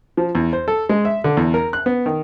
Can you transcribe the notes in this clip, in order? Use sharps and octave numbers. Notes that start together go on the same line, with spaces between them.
F3
E2
C5
A4
G#3
E5
D3
E2
A#4
F#6
B3
D#3